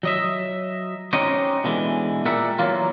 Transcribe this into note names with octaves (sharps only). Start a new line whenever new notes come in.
F#3 D#5 E5
C#4 D#4 F#4 G4 C5 D#5
B2 D3 E3 G#3
A#2 G3 A#4 E5 F#5
E2 F#3 A#3 F4